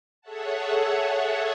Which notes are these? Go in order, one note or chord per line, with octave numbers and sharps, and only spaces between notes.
G#4 A4 C#5 E5 F#5 A5